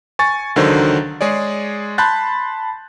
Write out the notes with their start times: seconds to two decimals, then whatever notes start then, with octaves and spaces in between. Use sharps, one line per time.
0.19 G#5 C#6 A6
0.56 C#2 D3 D#3 F#3 C5
1.21 G#3 G#4 C#5 D5
1.98 A5 B5 C6 F#6 G6 A6